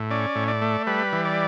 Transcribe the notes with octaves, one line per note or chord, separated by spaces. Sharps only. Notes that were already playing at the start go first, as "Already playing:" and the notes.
Already playing: A2
C#4 D5
A2
D5
A3
G3 B4
E3
D5